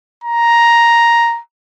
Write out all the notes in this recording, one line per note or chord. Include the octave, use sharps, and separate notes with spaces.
A#5